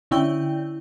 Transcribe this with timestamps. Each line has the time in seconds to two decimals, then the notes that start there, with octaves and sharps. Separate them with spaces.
0.11 D3 C#4 E4 G5 G6